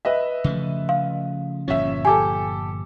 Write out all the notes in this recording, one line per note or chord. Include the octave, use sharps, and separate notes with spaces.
B4 D#5 E5
C#3 F3 A3
F5
G1 A#2 F3 C#4 E5
G4 A4 G#5 D6